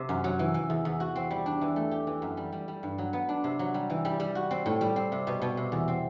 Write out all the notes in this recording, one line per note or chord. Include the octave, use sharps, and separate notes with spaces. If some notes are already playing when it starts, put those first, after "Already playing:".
Already playing: C3
F#2
F#3
E3
E3
E2
E2
F#4
C4
G3
D4
E3
A3
G4
E3
F#2
G3
G3
G3
G2
F#3
B3
D4
C3
F#3
G3
E3
G3
G3
F#4
C4
A2
G3
C4
C3
B2
B2
C3
E2
C4